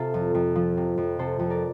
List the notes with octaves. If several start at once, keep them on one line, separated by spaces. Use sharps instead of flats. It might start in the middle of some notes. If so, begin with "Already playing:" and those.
Already playing: C3 F4 A4
F2
F2
F3
C3
F2
C3 A4 C5
F2
A#4 D5